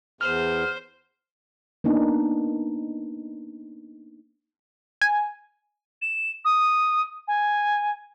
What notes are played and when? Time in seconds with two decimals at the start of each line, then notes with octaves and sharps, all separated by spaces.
0.21 E2 C5 F6
1.84 A#3 B3 D4 D#4 B4
5.01 G#5
6.02 E7
6.45 D#6
7.28 G#5